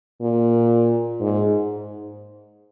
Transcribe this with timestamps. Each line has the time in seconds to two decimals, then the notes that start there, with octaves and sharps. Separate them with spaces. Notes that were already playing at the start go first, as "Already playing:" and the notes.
0.21 A#2
1.21 G#2